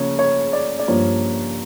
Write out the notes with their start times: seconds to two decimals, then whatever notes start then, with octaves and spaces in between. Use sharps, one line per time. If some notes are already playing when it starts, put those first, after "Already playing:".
Already playing: C#3 F3 A#3 C#5
0.19 C#5
0.53 D5
0.79 D5
0.88 G2 F3 A#3 C#5